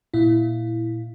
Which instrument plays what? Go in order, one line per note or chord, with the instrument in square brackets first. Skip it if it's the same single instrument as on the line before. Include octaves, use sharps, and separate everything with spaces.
[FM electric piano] A#2 E4